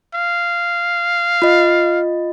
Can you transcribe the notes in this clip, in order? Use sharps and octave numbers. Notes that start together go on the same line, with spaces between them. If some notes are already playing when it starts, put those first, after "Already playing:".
F5
F4 D#5